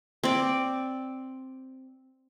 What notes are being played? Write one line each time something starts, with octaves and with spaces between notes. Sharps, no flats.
C4 D5